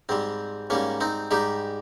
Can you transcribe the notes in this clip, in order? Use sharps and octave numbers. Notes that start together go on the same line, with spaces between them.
G#2 G3 C4
G#2 G3 A#3 C#4
C4 D#4
G#2 G3 D#4 G4